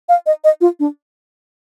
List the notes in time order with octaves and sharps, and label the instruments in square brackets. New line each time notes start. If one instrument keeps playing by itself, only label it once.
[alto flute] F5
D#5
D#5
F4
D4